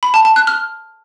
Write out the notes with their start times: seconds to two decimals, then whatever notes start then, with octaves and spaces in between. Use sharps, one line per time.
0.03 B5
0.14 A5
0.25 A5
0.36 F#6
0.47 F6